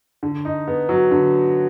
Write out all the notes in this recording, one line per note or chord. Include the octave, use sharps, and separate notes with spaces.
D3
D#4
B3
F#3
D3